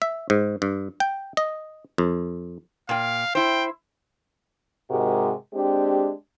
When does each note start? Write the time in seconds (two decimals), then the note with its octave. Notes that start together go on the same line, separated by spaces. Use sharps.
0.02 E5
0.30 G#2
0.62 G2
1.00 G5
1.37 D#5
1.98 F2
2.89 A#2 F5 G5
3.35 E4 C5 G5
4.89 G#2 C3 G#3 F#4 G4 A#4
5.53 G#3 C4 D4 G4